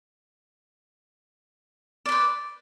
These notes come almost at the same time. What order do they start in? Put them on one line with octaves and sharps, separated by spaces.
D5 B4 C5